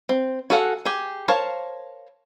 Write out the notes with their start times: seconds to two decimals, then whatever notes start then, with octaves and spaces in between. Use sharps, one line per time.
0.09 C4
0.50 F#4 G#4 A4 F5 F#5
0.85 G4 G#4
1.28 A#4 C5 C#5 F5 A5